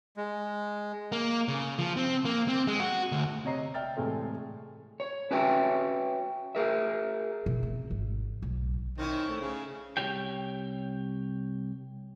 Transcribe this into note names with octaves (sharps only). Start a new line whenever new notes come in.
G#3
A#3
C#3
F3
C4
A#3
C4
G#3
F#4
D2
C3 C#5 D#5 A#5 C7
D5 E5 G5 F6 A6
A2 C3 E3 G#3 A3
C#5
C#4 F#4 B4 C#5 E5 G5
G#4 A#4 E5
B2
C4
G#1
B1
D#3 C4 C#4 E4
A3
C#3
C2 G4 C#5 G5